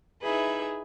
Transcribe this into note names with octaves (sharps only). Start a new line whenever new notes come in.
D#4 E4 G#4 B4 E5